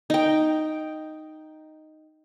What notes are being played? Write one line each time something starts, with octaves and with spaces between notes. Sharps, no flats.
D#4 G5